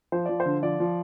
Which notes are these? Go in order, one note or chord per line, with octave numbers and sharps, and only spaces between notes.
F3 C5
F3 D5
C5
D3
F3 D5
F3